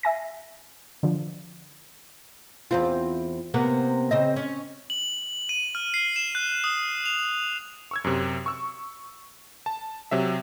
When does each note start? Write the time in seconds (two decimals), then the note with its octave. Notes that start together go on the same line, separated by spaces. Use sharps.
0.03 E5 G#5 A#6
1.03 D3 F3
2.71 E2 C4 F4
3.54 C3 A#3 B3
4.11 C#3 C4 D#5
4.36 C#4
4.90 F#7
5.49 D#7
5.75 F6
5.94 C7
6.16 E7
6.35 F#6
6.64 D#6
7.06 F7
7.91 C#6 E6 G#6
8.04 F#2 C3
8.46 C#6 E6
9.66 A5
10.11 C3 F#3 E5